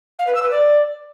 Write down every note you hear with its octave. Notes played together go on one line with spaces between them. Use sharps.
F5
B4
E6
B4
D5